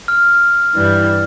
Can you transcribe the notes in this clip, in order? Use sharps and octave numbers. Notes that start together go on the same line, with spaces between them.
F6
G2 E3 G3